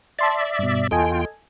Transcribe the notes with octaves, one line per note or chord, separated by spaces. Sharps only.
D5 E5 A5 C6 A6
G2 B2
E2 F4 A4 D#5 G5 G#5